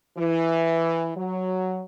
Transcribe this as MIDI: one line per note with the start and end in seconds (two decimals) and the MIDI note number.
0.18 1.09 52
1.16 1.82 54